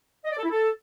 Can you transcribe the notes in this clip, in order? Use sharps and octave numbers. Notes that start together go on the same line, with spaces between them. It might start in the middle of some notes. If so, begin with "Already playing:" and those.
D#5
D5
A4
E4
A4